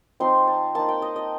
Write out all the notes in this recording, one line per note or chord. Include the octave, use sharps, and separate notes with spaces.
F3 C4 D#4 C6
A5
A#3 D#4 A5
G5
D#5
D#5